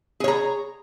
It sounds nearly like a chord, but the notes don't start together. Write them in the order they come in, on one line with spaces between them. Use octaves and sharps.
G#4 C#5 A#5